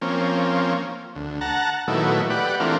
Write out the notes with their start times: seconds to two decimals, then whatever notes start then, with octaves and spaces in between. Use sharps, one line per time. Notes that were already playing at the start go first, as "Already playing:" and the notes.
0.01 F3 A#3 C4 C#4
1.15 D2
1.41 F#5 A5 A#5
1.88 A#2 D#3 F#3 A3 B3 E4
2.30 G4 B4 D5 F#5
2.60 E3 A3 C4 D4 F4 A#4